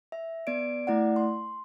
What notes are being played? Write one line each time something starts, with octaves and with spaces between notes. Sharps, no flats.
E5
B3 D5 D7
A3 E4 D5 F#5
C6